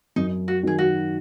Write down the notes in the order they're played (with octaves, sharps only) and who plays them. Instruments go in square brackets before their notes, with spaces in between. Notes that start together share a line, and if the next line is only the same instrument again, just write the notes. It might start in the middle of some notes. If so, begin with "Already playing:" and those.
[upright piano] F#2 [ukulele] D#4
[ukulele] F#4
[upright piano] D#3 F#3 [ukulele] G#4
[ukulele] F#4